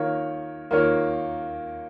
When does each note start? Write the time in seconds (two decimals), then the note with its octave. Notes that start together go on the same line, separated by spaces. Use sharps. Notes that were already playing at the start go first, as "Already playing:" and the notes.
Already playing: D#3 A#3 F4 A#4 C#5
0.71 D#3 A#3 F4 A#4 C#5